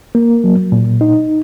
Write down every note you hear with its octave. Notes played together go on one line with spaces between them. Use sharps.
A#3
F#3
A#2
D#4